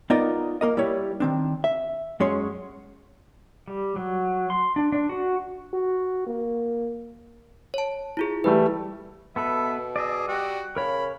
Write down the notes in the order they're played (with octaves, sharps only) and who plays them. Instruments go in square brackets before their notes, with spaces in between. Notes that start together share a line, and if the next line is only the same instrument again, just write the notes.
[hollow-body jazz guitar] B3 D#4 F4 A#4 D5 D#5
A#3 A#4 D#5
G3 E4 C#5
D#3 C4 D4
E5
F#2 G#3 C#4 C#5 C6
[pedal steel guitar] G3
F#3
C6
D4
D4
F#4
[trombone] F#4
A#3
[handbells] C#5 A5
E4 F4 G#4
[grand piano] E3 G3 A3 [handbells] B4
[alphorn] B2 [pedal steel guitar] B3 A4 B4 [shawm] E5
[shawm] G#4 [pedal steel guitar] D5 D#5 E6
[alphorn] G3 [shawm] F#4
[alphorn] C#3 [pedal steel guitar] A#4 C#5 [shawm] B5